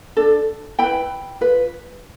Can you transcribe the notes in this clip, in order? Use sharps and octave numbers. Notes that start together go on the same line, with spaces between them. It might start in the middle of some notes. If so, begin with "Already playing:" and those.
D4 A4
E4 B4 G5 B5
F4 B4